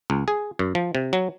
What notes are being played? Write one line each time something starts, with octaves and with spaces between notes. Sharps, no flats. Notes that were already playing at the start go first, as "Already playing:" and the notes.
C#2
G#4
F#2
F3
C3
F#3